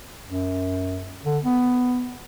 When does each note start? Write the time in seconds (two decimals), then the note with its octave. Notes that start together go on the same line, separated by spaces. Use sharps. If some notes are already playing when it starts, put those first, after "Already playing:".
0.27 F#2
1.25 D3
1.44 B3